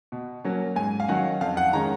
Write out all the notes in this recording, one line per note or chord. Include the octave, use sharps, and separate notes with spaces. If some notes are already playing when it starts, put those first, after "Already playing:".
B2
F#3 A#3 C#4
G#2 G#5
F5
D#3 F#3 C#4 F#5
F2 F5
F#5
D#3 G#3 C#4 A#5